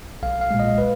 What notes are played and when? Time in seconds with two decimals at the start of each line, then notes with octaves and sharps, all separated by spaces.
0.23 B1 F5
0.41 F5
0.51 A#2 G#3
0.60 D#5
0.78 B4